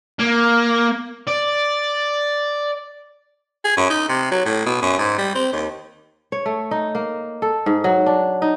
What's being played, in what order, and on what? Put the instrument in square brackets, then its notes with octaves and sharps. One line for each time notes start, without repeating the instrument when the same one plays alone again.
[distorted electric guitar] A#3
D5
[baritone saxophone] G#4
F#2
D#4
C3
F#3
A2
B2
F#2
G#2
G3
C4
D#2
[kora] C#5
A3
D#4
A#3
A4
G#2
F#3
D4
D#4